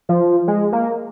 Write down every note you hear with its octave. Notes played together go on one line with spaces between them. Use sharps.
F3
G#3
A#3